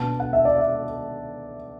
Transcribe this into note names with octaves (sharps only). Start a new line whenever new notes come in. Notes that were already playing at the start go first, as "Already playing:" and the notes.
Already playing: B2 B3 D4 A5
F#5
E5
D5
E5